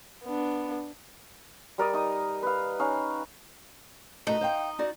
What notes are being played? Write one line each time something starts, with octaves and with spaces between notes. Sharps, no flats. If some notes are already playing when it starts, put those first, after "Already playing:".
B3 D4
G3 A#4 D5 D#5
D#4 D#6
B4 F5
C#4 D#4 F5
A3 D#4 F#4 B4
C5 F5 G5
D#4 F#4 D5